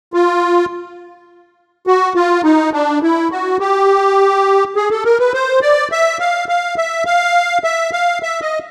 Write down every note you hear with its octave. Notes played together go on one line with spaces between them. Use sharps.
F4
F#4
F4
D#4
D4
E4
F#4
G4
G#4
A4
A#4
B4
C5
D5
E5
F5
F5
E5
F5
E5
F5
E5
D#5